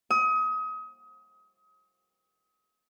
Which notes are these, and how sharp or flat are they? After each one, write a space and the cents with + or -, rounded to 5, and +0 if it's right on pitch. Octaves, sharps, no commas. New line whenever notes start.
D#6 +30